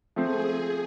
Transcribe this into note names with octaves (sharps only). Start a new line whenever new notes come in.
F3 A3 C4 G#4